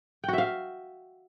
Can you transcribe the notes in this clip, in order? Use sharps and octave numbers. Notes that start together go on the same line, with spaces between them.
F#4 E5 F5 G5